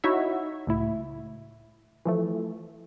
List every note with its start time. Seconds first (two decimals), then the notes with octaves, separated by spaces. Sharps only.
0.04 D#4 E4 F#4 C#5 E5
0.67 C#2 A2 E4
2.06 E3 F3 A3